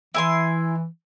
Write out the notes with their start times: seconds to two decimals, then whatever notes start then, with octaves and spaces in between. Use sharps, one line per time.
0.14 E3 E4 G#5 C6